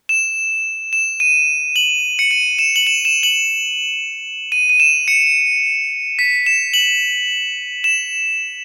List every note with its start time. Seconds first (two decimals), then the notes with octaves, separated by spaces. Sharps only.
0.09 E7
0.93 E7
1.20 D#7
1.76 F#7
2.19 C#7
2.31 D#7
2.59 E7
2.76 F#7
2.87 E7
3.05 E7
3.23 F#7
4.52 D#7
4.70 D#7
4.80 E7
5.08 C#7
6.19 B6
6.46 E7
6.74 F#7
7.84 E7